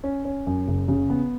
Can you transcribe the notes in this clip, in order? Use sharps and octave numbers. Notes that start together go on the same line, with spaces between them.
C#4
C#4
F#2
F#1
C#3
B3